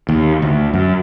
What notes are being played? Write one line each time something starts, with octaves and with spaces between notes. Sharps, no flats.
D#2
D2
F#2